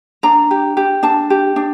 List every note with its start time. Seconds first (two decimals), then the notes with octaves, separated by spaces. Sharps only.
0.23 D4 A#5
0.51 G4
0.77 G4
1.03 D4 A5
1.30 G4
1.56 D4